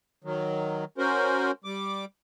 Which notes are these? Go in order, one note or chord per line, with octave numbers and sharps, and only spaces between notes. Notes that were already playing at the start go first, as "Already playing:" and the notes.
D#3 F#3
C#4 F#4 A#4 C5
G3 D6